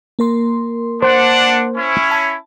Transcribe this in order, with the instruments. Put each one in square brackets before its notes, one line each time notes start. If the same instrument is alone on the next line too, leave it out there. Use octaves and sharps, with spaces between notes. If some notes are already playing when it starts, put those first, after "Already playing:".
[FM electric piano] A#3 A#4 C6
[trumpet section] D4 F#5 [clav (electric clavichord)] C5
[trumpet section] C#4 E4
[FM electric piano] A5